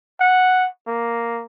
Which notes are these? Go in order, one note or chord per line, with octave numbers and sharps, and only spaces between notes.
F#5
A#3